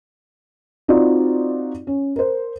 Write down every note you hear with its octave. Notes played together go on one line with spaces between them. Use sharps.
C4 D#4 F4 F#4 D5
C#4
A#4 C5